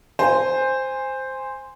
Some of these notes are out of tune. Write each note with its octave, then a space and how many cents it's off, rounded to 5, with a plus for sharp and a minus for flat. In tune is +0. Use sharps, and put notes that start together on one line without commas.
C5 +0 G#5 -20